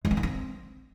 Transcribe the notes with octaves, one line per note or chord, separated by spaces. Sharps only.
G#3
C4
D#3
C4